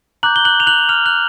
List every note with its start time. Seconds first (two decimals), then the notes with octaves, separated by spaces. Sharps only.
0.23 A#5 D6 F#6 G6 F#7
0.36 G7
0.45 F#6 F#7
0.60 F7
0.67 F#6 F#7
0.89 F6 F7
1.06 F#6 F#7